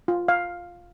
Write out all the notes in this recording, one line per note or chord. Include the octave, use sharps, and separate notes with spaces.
F4
F5